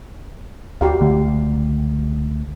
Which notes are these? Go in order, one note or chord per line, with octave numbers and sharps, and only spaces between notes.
D2 F#4 G4 F5
C#2 D3 A3